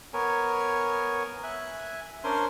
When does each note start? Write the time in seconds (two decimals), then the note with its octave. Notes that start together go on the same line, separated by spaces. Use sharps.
0.13 B3 A#4 C#5 G#5
1.44 E5 G#5 F#6
2.24 C#4 D4 A#4 C5 G#5 C6